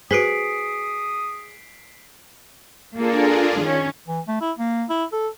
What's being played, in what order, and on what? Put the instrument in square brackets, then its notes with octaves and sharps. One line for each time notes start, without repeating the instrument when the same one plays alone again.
[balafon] F#4 B4 C5 [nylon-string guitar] G#4 [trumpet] D#6 [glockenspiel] B6 C7 D7
[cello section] A#3 A4 [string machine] D4 F4 G#4
[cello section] D#3 C#4
[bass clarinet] E3
A3
E4
A#3
E4
A4